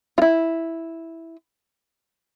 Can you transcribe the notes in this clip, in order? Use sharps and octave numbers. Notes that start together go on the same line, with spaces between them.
F4
E4